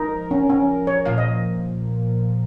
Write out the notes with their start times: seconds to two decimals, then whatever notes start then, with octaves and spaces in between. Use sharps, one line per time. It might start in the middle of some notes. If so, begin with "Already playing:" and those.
Already playing: F3 D#4 A#4
0.31 C#4
0.50 C#4
0.87 C#5
1.05 A#2 F3 A#3 F5
1.18 D#5